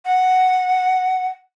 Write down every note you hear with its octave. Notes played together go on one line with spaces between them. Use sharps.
F#5